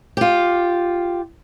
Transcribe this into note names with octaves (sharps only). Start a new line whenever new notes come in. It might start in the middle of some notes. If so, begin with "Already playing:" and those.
F4 G4